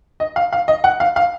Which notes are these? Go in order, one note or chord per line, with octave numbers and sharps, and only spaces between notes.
D#5
F5
F5
D#5
F#5
F5
F5